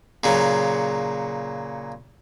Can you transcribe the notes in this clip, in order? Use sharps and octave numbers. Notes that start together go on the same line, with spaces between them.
A#2 C#3 F#3